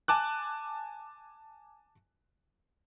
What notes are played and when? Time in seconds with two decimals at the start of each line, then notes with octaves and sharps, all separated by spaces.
0.08 G#5 A5 D6 F#6